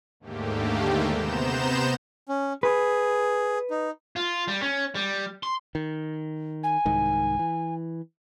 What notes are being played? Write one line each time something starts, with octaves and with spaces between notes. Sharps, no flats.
D#2 G#2 D3 A3 A#3 G4
C3 B3 C5 A#5 G6 E7
C#4
G#4 B4
D#4
F4
G3
C#4
G3
C6
D#3
G#5
C2 G#2 D#3
E3